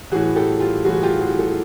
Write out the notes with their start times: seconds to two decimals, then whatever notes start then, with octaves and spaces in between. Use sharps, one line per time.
0.12 A2 E3 F#4 G#4
0.36 G4 A4
0.60 F4 G4
0.84 A2 E3 F#4 G#4
1.03 F4 G4
1.21 F#4 G#4
1.39 G4 A4